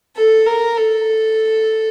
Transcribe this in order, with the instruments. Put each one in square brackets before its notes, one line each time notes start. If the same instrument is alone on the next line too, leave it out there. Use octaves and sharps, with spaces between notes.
[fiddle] A4
A#4
A4